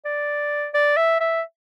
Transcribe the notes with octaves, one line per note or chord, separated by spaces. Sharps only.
D5
D5
E5
E5